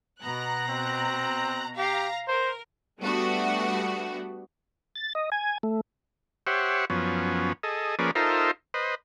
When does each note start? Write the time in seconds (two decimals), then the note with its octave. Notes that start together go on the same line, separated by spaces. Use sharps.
0.23 B2 B3 A#5 F#6
0.68 C4
1.77 G4 F5 A#5
2.28 A#4 C5
2.99 G3 A3 B3 D4 F#4
4.96 A6
5.15 D#5
5.32 G#5
5.63 A3
6.47 G4 C5 C#5 E5 F#5
6.90 F#2 F3 B3 C#4
7.63 G#4 A4 D#5
7.99 F3 A#3 C#4 G#4 B4 D5
8.15 D#4 F4 A4 A#4 C5 E5
8.74 B4 C5 D#5